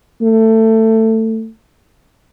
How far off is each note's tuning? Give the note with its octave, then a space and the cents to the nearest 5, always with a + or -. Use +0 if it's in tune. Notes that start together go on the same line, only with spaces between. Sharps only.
A3 +20